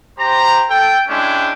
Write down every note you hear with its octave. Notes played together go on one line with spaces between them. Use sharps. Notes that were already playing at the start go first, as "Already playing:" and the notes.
G4 C5 A#5
A4 G5
G#3 C#4 D4 E4 G5